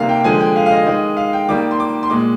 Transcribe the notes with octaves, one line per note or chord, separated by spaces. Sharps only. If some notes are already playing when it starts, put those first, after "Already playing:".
Already playing: C3 D#3 G3 A#3 F5
G5
D3 F3 G#3 G#5
G5
F5
F5
D#5
D#3 G#3 D#5
F5
G5
D#3 G3 A#3 D6
C6
D6
C6
A#2 G#3 D6